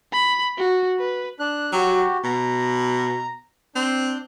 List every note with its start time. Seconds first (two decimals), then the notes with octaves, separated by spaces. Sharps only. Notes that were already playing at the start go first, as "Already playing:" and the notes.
0.12 B5
0.58 F#4
0.99 B4
1.40 D4 F#6
1.72 F#3 F#4 G4
2.24 B2 A#5
3.76 C4 D4 G6